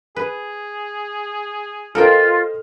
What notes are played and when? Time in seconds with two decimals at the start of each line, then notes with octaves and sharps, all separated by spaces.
0.16 G#4 B4
1.95 F4 A4 A#4 C5 D#5 G5 F6